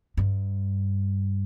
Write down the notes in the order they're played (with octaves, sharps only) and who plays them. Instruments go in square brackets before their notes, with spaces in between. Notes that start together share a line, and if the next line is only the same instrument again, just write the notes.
[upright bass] G2